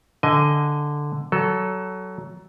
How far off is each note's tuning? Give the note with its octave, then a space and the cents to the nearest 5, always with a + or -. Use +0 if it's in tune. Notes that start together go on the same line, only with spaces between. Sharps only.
D3 +0 D#5 +10 G#5 +0
F#3 +20 A4 +0